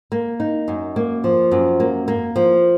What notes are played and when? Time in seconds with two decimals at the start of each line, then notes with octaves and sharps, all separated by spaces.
0.12 A#3
0.40 D#4
0.68 F#2
0.96 A#3
1.24 F3
1.51 F#2
1.80 A#3
2.08 A#3
2.36 F3